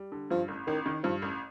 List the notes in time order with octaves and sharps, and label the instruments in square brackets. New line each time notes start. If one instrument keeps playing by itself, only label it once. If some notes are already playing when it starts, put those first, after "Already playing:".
Already playing: [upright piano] G3
D3
[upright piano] G2 [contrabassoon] F3
[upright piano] A1
[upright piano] A1 [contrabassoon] D#3
[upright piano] D#3
[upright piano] G2 [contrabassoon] F3
[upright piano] A1